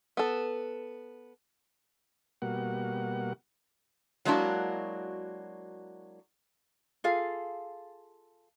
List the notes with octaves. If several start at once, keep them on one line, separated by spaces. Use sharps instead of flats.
B3 A4
B2 G3 A#3 F#4 F#5
F#3 G#3 A#3 D4 E4 F#4
F4 G#4 A4 F5